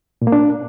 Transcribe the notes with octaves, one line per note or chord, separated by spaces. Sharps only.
A#2
A#3
D4